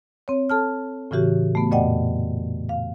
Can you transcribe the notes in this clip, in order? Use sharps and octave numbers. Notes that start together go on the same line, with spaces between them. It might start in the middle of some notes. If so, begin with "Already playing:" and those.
C4 C#5
A4 A5 F6
A2 C#3 E3 F#4 G4
A3 B3
F2 A#2 D5 D#5 F#5 G5
F5